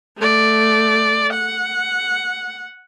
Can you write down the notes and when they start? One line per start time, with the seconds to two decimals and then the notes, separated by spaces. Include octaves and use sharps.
0.17 A3 D5
1.33 F#5